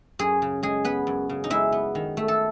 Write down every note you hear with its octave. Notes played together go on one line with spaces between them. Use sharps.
F#2 G#4
C#3
G#3 G#4
B3 B4
F#2
C#3
D#4
G#3 E4
B3
D#3
A3
A4